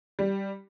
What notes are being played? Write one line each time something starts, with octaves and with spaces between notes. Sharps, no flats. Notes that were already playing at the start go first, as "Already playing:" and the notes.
G3